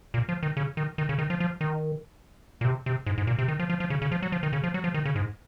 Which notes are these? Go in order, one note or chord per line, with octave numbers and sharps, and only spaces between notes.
A#2
F3
D#3
C#3
D#3
D#3
C#3
D#3
F3
F3
D#3
A#2
C3
C3
G#2
G#2
A#2
C3
D#3
F3
F3
F3
C#3
C#3
F3
F#3
F3
D#3
C#3
F3
F#3
F3
D#3
C#3
G#2